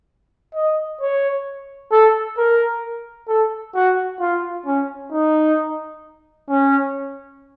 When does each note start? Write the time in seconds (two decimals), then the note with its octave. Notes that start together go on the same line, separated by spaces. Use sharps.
0.55 D#5
1.01 C#5
1.92 A4
2.38 A#4
3.29 A4
3.75 F#4
4.20 F4
4.66 C#4
5.12 D#4
6.49 C#4